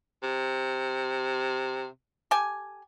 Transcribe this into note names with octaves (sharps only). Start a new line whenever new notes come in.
C3
G4 A4 G#5